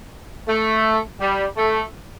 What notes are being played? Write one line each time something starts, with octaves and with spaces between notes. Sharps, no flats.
A3
G3
A3